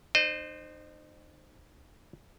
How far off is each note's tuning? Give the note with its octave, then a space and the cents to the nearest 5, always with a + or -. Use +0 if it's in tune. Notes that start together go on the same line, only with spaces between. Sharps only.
D#4 -35 C5 +0 D#5 -35